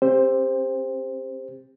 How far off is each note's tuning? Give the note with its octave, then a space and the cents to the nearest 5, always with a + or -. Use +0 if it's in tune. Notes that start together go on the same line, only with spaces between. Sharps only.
C4 +25 G4 +25 C5 +0